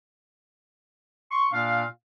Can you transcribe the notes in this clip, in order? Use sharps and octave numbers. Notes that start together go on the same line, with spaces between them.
C6 C#6
A#2 A#3 D4 F5